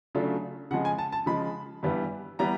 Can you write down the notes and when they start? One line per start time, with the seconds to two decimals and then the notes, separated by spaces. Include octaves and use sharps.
0.15 C#3 F#3 A3 D4 F4
0.71 C#3 F3 G#3 F#5
0.85 G#5
0.98 A5
1.12 A5
1.26 C#3 F3 G#3 B5
1.83 G2 E3 G3 B3
2.39 E3 G3 B3 A#5